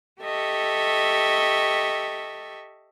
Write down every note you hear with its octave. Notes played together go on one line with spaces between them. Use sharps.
G4 A4 D#5 E5 C#6